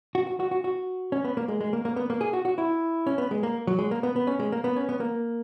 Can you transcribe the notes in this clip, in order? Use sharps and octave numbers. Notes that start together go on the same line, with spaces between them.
F#4
F#4
F#4
F#4
F#4
C#4
B3
A#3
G#3
G#3
A#3
A#3
B3
A#3
G#4
F#4
F#4
E4
C#4
B3
G#3
A#3
F#3
G#3
A#3
B3
B3
C#4
G#3
A#3
B3
C#4
B3
A#3